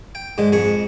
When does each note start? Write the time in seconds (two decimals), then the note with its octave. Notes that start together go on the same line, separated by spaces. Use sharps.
0.15 G5
0.38 G#2 D3 G#3
0.52 F2 G#2 G#4 C#6